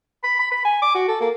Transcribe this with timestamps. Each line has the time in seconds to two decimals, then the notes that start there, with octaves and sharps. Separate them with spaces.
0.23 B5
0.39 B5
0.51 B5
0.65 G#5
0.82 D6
0.95 F#4
1.08 A4
1.20 A#3